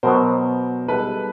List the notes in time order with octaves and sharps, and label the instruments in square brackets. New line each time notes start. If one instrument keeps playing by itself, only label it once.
[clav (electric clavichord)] B2 F#3 B3 [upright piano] A#4 C5
[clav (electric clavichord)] G3 B3 D#4 G#4 [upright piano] A4 B4